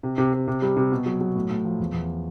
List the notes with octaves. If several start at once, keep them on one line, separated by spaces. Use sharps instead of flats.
C3
C3
C3
C3
G3
C3
B2
F#3
F#3
A2
A2
F3
E2
E2